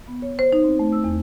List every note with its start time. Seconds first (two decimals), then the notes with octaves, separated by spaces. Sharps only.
0.08 B3
0.22 C#5
0.39 C5
0.53 D#4
0.64 C4
0.79 A3
0.93 E6
1.04 E2